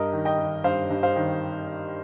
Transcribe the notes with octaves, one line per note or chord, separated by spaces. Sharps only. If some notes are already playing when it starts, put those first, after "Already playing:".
Already playing: G2 A#4 D#5
D#3
D#5 G5
D#3
G2 C5 F5
G2
C5 F5
D#3